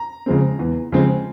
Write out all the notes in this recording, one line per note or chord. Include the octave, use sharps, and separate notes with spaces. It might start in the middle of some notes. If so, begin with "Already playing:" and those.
Already playing: A#5
C#3 F3 G#3 C4
E2
C#3 F3 G#3 C4